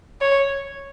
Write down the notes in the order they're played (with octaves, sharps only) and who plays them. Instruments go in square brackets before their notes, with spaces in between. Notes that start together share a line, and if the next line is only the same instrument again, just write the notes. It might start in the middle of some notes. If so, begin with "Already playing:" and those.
[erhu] C#5